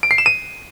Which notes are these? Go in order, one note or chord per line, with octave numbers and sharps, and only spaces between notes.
D7
C7
E7
D#7